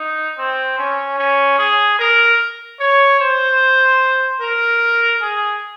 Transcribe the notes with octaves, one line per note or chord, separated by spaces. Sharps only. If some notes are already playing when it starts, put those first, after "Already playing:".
Already playing: D#4
C4
C#4
C#4
G#4
A#4
C#5
C5
A#4
G#4